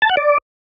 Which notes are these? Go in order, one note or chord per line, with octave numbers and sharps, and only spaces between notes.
A5
F#5
D5